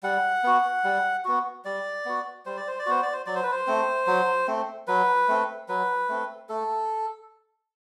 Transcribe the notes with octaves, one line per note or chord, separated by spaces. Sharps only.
G3 F#5
B3 F#4
G3
B3 F#4
G3 D5
B3 F#4
G3 C5
D5
C5
D5
B3 F#4 C5
D5
C5
F#3 D5
C5
B4
C5
A3 C4
F#3
A3 C4
F#3 B4
A3 C4
F#3 B4
A3 C4
A3 A4